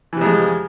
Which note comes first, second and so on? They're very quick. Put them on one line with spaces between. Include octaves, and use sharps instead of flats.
E3 C3 F2 G#3